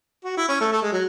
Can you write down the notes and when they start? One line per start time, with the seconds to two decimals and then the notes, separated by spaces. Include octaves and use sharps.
0.25 F#4
0.37 E4
0.49 C#4
0.61 A3
0.72 A3
0.82 G#3
0.92 F#3